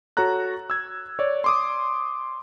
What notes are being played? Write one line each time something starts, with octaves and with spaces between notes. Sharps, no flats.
F#4 A4 C#5 A#5 F#6
E6 G#6
C#5 D5
C6 D6 D#6